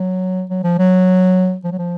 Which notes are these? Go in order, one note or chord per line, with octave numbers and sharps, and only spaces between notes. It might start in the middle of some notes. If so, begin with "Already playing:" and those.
Already playing: F#3
F#3
F3
F#3
F3
F#3
F3